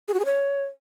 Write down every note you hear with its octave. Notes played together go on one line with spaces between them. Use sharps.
G#4
F#4
G#4
C#5